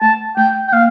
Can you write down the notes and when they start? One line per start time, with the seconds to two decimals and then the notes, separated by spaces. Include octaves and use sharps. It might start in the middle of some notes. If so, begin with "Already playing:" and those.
0.01 A3 A5
0.37 A3 G5
0.68 G5
0.72 A#3 F5